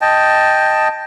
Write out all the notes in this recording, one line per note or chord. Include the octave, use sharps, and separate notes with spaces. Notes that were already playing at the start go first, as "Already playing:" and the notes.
D#5 G5 A5